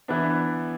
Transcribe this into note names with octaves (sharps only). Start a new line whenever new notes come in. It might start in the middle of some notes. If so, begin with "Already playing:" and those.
E3 B3 D4